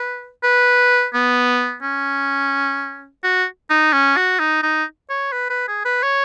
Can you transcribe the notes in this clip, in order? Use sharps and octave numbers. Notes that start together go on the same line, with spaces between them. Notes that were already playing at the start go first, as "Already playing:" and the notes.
Already playing: B4
B4
B3
C#4
F#4
D#4
C#4
F#4
D#4
D#4
C#5
B4
B4
G#4
B4
C#5